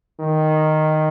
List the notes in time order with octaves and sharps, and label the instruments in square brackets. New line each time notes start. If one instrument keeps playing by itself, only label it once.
[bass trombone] D#3